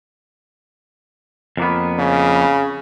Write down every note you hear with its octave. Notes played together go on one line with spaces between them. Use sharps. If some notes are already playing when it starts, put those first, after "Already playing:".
F2 A#3 B3
C#3